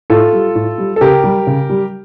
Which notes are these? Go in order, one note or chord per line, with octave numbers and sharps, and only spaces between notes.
A2 F4 A4
G3
A2
G3
A4
C#3 G4 A#4
G3
C#3
G3